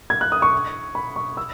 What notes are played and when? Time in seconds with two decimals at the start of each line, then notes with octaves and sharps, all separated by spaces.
0.10 G#6
0.21 F#6
0.32 D#6
0.42 C#6
0.95 B5
1.16 C#6
1.37 E6